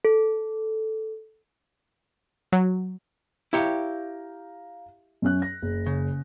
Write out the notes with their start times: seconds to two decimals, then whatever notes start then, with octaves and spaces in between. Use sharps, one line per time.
0.05 A4
2.52 F#3
3.53 E4 G4 C#5 F5 A#5
5.22 F#2 C#4 F#6
5.42 A#6
5.62 F#1
5.86 C#3